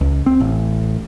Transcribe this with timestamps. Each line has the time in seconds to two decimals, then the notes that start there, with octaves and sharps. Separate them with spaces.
0.01 C#2
0.26 C4
0.40 A1